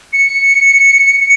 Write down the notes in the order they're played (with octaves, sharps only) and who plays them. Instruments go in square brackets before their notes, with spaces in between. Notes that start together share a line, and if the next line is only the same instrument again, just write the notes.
[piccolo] C#7